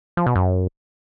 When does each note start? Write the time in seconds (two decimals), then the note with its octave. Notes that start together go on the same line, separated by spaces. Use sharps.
0.17 F3
0.26 B2
0.36 F#2